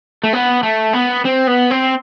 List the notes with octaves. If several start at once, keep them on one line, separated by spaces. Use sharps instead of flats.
A3
B3
A3
B3
C4
B3
C4